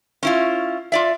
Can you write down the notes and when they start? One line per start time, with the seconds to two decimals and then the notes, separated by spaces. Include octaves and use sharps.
0.23 C#4 E4 F4
0.92 F4 D5 E5